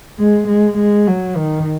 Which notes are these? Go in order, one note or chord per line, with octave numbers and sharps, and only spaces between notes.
G#3
G#3
G#3
F#3
D#3